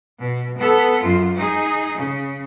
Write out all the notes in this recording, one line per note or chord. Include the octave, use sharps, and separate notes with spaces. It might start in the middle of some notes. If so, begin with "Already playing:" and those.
B2
B3 A4
F#2 F4
D#4 G#4
C#3